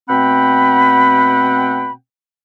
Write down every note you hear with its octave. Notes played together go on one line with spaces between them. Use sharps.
B2 A3 C4 F#5 G5 B5